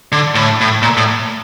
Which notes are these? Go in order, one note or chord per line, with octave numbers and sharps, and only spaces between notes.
D3
A2
A2
A#2
A2